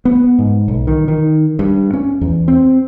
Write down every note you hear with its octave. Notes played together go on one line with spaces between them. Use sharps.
B3
G#2
B1
D#3
D#3
G2
C#4
E2
C4